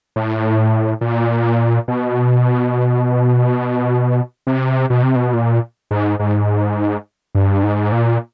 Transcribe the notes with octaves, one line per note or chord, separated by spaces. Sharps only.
A2
A#2
B2
C3
B2
C3
B2
A#2
G#2
G#2
G2
G#2
A#2